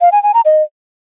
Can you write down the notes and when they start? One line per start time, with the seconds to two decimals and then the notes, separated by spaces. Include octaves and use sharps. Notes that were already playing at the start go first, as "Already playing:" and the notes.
0.01 F5
0.12 G#5
0.23 G#5
0.34 A#5
0.45 D#5